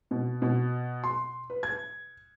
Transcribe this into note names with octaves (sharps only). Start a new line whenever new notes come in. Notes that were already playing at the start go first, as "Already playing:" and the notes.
B2
B2
C6
B4
G#6